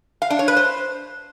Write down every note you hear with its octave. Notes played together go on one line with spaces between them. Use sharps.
F5
D4
C#5
B4
C5